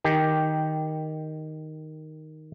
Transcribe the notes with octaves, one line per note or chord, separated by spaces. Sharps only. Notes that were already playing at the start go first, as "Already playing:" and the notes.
D#3 G4